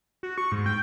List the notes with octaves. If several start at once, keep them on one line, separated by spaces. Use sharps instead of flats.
F#4
C#6
G#2
G5